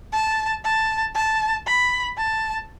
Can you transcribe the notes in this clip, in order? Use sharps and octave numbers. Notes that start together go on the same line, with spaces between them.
A5
A5
A5
B5
A5